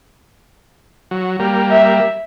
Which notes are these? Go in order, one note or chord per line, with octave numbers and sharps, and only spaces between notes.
F#3
G3 A#3
E5